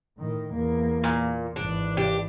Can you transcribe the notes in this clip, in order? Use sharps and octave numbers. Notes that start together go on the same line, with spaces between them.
A2 D#3
E2 A#3
A#2
G#1 E3 D4
D4 G4